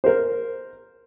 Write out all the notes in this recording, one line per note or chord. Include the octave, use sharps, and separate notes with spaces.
A#4 C5